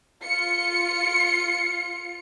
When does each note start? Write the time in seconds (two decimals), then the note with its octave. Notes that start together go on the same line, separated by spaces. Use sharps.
0.24 F4 C#7